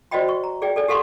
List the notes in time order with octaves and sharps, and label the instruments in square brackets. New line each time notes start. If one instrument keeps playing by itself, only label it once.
[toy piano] F#4 C5 D5 D#5 G5 B5
C#6
A#5
G#4 D5 G5
A4 D5 G#5
G4 A4 F#5 C6 C#6